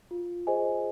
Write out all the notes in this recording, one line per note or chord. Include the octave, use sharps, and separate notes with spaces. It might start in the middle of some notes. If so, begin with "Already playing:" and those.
F4
G#4 C5 D#5 G#5